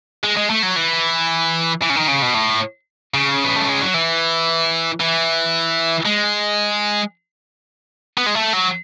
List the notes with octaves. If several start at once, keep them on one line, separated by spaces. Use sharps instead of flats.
G#3
G#3
A3
F#3
E3
E3
C#3
D#3
C#3
B2
A2
C#3
B3
A3
G#3
F#3
E3
E3
G#3
B3
G#3
A3
F#3